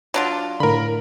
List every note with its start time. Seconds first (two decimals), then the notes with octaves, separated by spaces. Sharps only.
0.14 F#3 D4 F4
0.60 A2 D3 A#4 B5